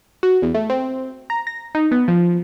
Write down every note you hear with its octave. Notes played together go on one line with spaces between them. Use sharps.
F#4
E2
A3
C4
A#5
A#6
D#4
B3
F3